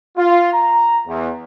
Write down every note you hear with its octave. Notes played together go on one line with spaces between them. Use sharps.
F4
A#5
E2